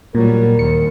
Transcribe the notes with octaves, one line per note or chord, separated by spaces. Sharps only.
A#2 F#3 G3 A#4
D#2 C#7